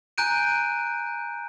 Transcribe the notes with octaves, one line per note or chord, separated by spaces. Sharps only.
G#5 A#5 F#6 G6 D7 D#7